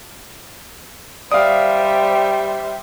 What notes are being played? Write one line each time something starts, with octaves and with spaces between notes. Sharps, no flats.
G3 C5 D5 E5 F5 D#6